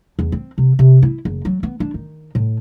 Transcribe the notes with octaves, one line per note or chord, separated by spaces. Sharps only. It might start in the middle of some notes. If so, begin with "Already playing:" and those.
E2
C4
C3
C3
E4
F#1
F#3
B3
D4
D#3
A2